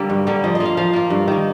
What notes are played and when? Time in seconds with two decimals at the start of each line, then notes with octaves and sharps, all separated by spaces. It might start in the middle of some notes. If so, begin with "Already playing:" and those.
Already playing: D3 G3 A#3
0.10 G2
0.27 D3 G3 A#3
0.44 F3 D#5
0.55 D#5
0.60 A#3 F4
0.65 F5
0.77 F3 F5
0.93 A#3 F4
1.10 G2
1.28 D#3 A#3